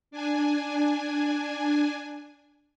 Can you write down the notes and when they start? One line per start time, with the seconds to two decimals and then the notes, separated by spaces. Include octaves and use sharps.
0.11 D4 G#5